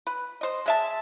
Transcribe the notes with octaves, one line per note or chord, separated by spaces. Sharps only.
B4
C5 D#5
G#3 E5 A5